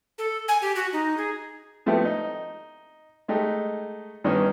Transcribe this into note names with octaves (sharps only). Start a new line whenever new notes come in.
A4
G#5
G4
F#4
D#4
G#4
F3 A3 B3 C4 E4 G4
D#4
G#3 A3 D#4 G4
G2 D#3 E3 B3 C#4 D#4